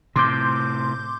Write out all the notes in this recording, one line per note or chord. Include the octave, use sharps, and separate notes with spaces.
A2 C3 C6 D6 G6